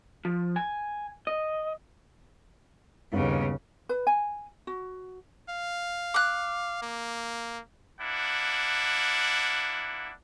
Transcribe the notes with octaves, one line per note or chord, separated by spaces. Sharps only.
F3
G#5
D#5
G1 D#2 C#3 B3
B4
G#5
F#4
F5
D6 F#6
A#3
A#3 D4 E4 F#5